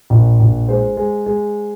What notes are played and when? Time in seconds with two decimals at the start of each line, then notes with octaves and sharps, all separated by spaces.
0.10 A#1
0.40 A#1
0.69 G#3 C5
0.97 G#3
1.26 G#3